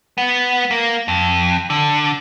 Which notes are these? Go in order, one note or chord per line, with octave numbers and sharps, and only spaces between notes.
B3
A#3
F2
D3